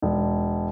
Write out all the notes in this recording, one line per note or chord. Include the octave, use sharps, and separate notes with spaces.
E1